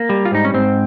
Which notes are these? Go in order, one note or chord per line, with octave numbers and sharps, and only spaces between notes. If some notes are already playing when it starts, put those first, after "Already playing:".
Already playing: A#3
G3
F4
G#2 D#4
C#4
G#2 C4